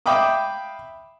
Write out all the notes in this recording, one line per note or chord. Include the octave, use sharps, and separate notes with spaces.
E5 F5 G5 B5 D6 D#6